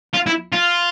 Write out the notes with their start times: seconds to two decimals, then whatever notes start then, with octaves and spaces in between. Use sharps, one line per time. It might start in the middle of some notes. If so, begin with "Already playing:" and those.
0.14 F4
0.26 E4
0.52 F4